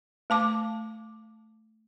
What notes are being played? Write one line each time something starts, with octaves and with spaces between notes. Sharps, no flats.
A3 A5 D6